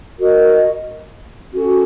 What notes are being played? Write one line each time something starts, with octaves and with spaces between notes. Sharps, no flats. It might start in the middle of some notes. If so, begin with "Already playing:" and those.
F#4 A#4 D#5
C#4 F#4 A4